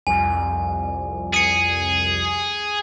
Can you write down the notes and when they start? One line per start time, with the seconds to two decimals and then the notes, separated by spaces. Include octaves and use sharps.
0.07 C2 F2 G#5
1.34 G#4 C#7 D#7